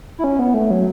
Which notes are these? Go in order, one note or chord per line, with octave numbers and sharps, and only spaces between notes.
E4
C#4
B3
A3
F#3